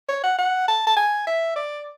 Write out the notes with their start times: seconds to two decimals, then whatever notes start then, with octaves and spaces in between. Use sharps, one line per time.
0.09 C#5
0.24 F#5
0.38 F#5
0.68 A5
0.87 A5
0.97 G#5
1.27 E5
1.56 D5